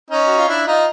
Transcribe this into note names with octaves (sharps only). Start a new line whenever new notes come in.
C#4 D#4
F#4
F4
D4 E4
D#4 F4